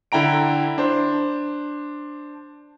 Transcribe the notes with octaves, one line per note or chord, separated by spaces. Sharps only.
D3 E4 G5 A#5 D7
D4 C5